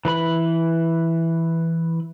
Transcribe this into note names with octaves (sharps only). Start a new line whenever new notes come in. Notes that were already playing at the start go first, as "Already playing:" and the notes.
E3 B4 B5